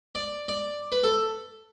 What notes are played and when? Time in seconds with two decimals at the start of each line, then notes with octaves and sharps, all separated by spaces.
0.15 D5
0.48 D5
0.92 B4
1.03 A4